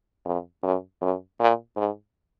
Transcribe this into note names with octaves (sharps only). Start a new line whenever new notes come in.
F2
F#2
F#2
A#2
G#2